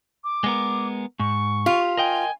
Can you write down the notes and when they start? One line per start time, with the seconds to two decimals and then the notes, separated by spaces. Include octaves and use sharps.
0.24 D6
0.44 G#3 B3 A#4
1.19 G#2 C#6
1.66 F4 G4
1.97 A#4 D#5 G5 G#5